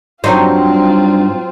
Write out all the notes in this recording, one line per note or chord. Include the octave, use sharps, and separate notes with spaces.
G2 F#3 C4 D#4 F4 C5